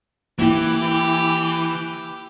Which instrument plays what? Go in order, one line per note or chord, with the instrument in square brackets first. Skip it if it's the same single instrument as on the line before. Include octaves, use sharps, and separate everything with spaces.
[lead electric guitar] E3 [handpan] A#3 E4 [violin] G4